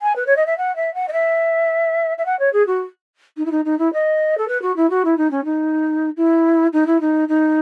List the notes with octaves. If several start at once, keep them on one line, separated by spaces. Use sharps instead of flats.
G#5
B4
C#5
D#5
E5
F#5
E5
F#5
D#5
E5
E5
F#5
C#5
G#4
F#4
D#4
E4
D#4
D#4
E4
D#5
A4
B4
F#4
E4
F#4
E4
D#4
C#4
D#4
E4
D#4
E4
D#4
D#4